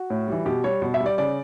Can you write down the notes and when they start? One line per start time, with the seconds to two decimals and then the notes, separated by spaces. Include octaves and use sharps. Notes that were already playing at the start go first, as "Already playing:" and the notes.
Already playing: F#4
0.10 A2
0.28 E3 G3
0.46 B2 G4
0.64 G3 C#5
0.82 B2
0.94 E5
1.00 G3
1.06 D5
1.18 C#3 D5